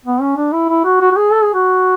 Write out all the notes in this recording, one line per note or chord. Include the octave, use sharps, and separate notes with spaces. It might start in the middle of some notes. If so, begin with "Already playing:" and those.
B3
C#4
D4
E4
E4
F#4
F#4
F#4
G#4
A4
G#4
F#4